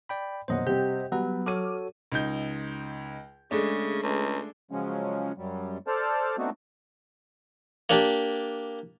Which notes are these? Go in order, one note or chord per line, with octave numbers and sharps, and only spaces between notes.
D5 G5 B5
A#1 F#2 B2 C5 D#5 F#5
C3 G3 C4 G4
F#3 G3 B3 B4
F#4 A4 C#5 D6 F6 D#7
C#2 D#4 G6
C#3 G#3 A3 D4
C#2
C#3 F3 F#3 G#3 C#4
F#2 F#3 G3
A4 C5 D5 A5 F6
A3 B3 C4 D4 D#4 F#4
A#3 D4 G4